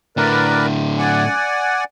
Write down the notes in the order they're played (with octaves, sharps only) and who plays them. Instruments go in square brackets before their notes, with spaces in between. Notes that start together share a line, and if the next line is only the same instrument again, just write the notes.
[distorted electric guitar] A2 D3 [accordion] A#4 B4 D5
[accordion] D5 F#5 G#5